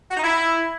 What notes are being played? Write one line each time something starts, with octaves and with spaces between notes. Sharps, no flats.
F#4
D#4
E4